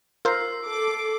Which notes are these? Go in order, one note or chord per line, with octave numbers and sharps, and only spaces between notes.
F4 A#4 C5 E6 C7
A4 D6